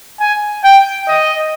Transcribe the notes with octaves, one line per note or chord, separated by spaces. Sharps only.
G#5
G5
D#5